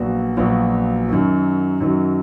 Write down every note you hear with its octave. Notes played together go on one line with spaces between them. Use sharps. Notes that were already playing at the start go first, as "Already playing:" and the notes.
Already playing: A#1 A#2 F#3 B3 F#4
A#1 A#2 F#3 B3 F#4
F#2 D#3 F#3
F#2 D#3 F#3